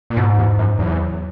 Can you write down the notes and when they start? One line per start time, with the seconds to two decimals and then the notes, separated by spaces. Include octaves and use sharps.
0.10 A#2
0.17 G#2 B2
0.38 E2
0.59 F#2
0.79 E2 F#3